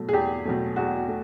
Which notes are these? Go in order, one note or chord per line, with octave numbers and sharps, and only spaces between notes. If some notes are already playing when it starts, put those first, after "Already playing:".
Already playing: B2 F#3 A3
G#4
E2 G4
B2 F#3 A3
E2 F#4
A3